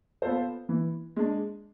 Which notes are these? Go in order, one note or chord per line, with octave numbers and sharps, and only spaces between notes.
B3 F4 A4 C5
E3
G#3 D4